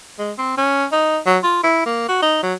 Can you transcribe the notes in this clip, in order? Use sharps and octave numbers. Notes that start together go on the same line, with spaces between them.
G#3
C4
C#4
D#4
F#3
F4
E4
A#3
F#4
D#4
F#3